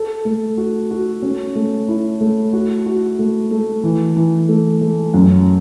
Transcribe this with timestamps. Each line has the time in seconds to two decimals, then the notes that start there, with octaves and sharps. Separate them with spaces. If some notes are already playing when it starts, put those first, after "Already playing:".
Already playing: A4
0.25 A3
0.58 F#4
0.91 F#4
1.22 C#4
1.55 A3
1.88 E4
2.21 A3
2.53 F#4
2.86 F#4
3.19 A3
3.51 A3
3.84 E3
4.17 E3
4.49 A3
4.81 A3
5.14 F#2